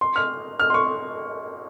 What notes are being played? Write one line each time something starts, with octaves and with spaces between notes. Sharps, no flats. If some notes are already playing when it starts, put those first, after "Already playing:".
C6
F6
F6
C6
C#6